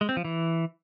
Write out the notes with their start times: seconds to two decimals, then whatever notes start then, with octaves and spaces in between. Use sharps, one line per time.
0.01 G#3
0.09 C4
0.17 F3
0.25 E3